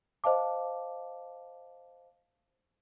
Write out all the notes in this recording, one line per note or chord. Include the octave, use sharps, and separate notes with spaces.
C5 D#5 F5 A5 D6